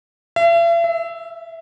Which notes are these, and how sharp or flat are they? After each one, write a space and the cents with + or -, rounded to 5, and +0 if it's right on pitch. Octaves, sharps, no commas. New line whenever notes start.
E5 +45
E5 -5